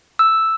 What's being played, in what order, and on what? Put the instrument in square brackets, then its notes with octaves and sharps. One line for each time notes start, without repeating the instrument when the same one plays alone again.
[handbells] E6